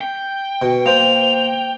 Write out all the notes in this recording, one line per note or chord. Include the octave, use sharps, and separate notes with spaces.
G5
B2
A#3 C5 F7